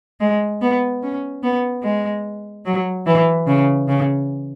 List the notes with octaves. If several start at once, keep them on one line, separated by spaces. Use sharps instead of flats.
G#3
B3
C#4
B3
G#3
F#3
E3
C#3
C#3